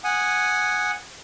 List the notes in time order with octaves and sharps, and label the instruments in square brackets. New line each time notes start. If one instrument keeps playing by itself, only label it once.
[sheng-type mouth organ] F#5 G#5 D#6